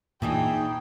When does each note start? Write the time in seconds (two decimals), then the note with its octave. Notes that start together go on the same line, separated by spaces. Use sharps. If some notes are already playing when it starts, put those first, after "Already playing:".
0.22 A#2 E3 D4 D#4 G#4 G5